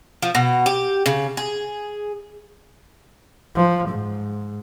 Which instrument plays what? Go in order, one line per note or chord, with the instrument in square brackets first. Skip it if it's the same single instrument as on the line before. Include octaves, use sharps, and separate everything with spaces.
[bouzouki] F3
B2
G4
C#3
G#4
[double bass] F3
G#2